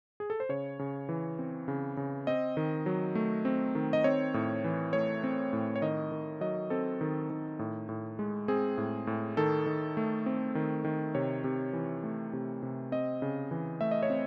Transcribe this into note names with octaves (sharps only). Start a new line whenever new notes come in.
G#4
A4
C5
C#3 C#5
C#3
E3
C4
C#3
C#3
C4 D#5
D#3
F#3
A3
C4
D#3
D#5
C4 C#5
A2
E3
A3 C#5
C4
A2
C#5
D#3 D#5
D#3
F#3 D#5
C4 A4
D#3
D#3
A2
A2
G#3
C4 G#4
A2
A2
D#3 A4
D#3
A3
C4
D#3
D#3
C3 C#5
C3
E3
A3
C3
C3
C4 D#5
C#3
E3
A3 E5
D#5
C#5
C4